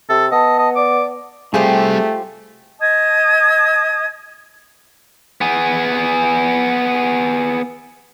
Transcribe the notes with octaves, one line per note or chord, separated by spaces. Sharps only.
C3 A4
B3 D#5 A5
D#5
D5 D6
G3 A3 C4 F4 G4 G#4 C5
D#5 A5 D#6 G#6
B3 G#4